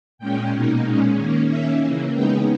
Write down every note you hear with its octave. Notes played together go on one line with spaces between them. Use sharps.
A#2 G#3 C#4 G5
B2 A#3 D#4
A#2 G#3 C#4
D#3 A#3 C#4
D#3 A#3 C#4 E5
C#3 E3 A#3
C#3 G#3 B3 D#4 G5